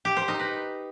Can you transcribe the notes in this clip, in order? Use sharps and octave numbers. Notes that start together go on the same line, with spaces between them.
G4
C5
D#4
B4